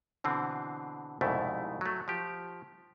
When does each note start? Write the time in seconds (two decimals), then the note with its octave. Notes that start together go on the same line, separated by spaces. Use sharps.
0.24 B2 D3 E3 C4
1.21 C2 F2 G#2 B2 A3 E4
1.81 F#3 A3
2.08 F3 G4